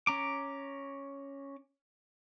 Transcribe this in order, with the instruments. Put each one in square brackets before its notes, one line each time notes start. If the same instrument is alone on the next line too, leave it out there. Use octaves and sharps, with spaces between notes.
[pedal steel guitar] C#4 A#5 D6